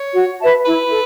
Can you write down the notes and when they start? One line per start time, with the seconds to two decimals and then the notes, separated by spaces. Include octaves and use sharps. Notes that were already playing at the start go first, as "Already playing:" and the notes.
Already playing: C#5
0.14 F#4
0.39 B4 E5 A5
0.65 E4 B4
0.90 A4